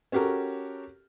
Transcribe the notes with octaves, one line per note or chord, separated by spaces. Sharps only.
C#4 F#4 G4 A4 A#4